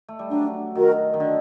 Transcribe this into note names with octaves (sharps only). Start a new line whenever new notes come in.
A3
G3
F#3 D4
D#3 F#4 A#4
D#3
D3 D4